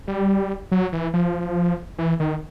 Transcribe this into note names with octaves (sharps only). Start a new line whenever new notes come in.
G3
F#3
E3
F3
E3
D#3